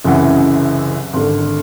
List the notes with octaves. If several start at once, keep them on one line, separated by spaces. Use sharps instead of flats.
F#1 C2 F#2 E3 E5 F#5
G#1 D3